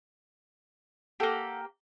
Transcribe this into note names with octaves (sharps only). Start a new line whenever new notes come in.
A#3 G4 A4 F#5 G5